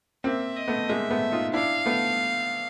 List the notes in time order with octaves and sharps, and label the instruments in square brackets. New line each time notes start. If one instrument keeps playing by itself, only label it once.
[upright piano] A#3 C4 [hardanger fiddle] E5
[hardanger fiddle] D#5
[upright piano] A3 B3
[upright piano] G#3 A#3 [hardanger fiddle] E5
[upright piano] A3 B3
D#4 F4
[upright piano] D4 E4 [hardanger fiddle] F5
[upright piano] A3 B3